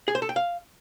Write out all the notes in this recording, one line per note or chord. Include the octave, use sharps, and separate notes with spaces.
G#4
C5
A4
G5
F5